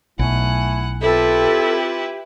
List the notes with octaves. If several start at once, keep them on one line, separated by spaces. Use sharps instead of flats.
B1 A3 E4 F#5 G#5
C4 E4 F4 G4 A4 B4